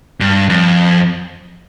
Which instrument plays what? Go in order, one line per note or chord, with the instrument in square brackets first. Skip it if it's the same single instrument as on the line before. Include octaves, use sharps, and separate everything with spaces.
[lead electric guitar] G2
F2